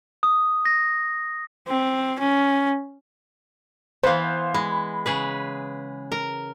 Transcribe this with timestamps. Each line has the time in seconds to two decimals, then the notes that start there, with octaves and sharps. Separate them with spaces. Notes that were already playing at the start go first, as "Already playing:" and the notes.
0.23 D#6
0.65 A#6
1.68 C4
2.19 C#4
4.03 E3 B3 C5 F5
4.54 G#3 B5
5.06 C#3 G#4 B4
6.12 A#4